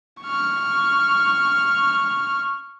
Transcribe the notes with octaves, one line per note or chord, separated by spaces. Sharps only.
C#6 F6